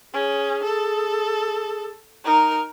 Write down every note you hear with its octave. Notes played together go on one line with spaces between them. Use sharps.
C#4 G#4
A4
D#4 A#4